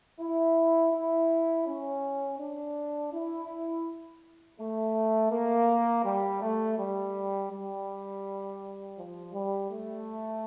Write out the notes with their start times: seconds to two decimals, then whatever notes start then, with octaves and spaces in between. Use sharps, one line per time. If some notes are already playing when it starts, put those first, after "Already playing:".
0.20 E4
0.93 E4
1.66 C#4
2.39 D4
3.13 E4
4.59 A3
5.31 A#3
6.04 G3
6.41 A3
6.78 G3
7.50 G3
8.97 F3
9.34 G3
9.71 A3